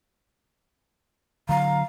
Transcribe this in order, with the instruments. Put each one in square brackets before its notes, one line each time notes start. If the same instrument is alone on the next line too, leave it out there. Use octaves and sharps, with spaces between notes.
[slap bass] D3 F#3 [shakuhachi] F5 [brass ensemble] A#5